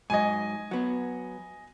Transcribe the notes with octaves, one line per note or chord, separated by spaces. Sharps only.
G#2 F#3 D#5 G#5
F#3 B3